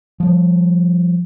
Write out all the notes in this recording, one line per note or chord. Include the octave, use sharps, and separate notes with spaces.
F3 G3